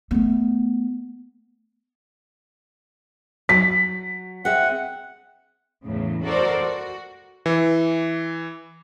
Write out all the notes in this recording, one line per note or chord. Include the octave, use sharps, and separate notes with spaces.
A3 B3
F#3 B6
C4 G#4 E5 F#5
E2 A2 C#3
F#4 A4 A#4 C5 D5
F#4
E3